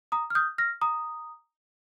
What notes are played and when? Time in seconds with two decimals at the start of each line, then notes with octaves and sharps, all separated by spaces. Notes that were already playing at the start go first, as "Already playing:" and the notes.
0.12 A#5 D#6
0.30 F6
0.35 D#6 G6
0.58 F6 A#6
0.81 A#5 D#6